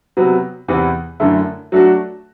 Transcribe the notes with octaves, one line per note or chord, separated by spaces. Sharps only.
C3 F#3 B3
E2 C3 E3 B3
F#2 D3 A3 E4
F#3 A3 D4 F#4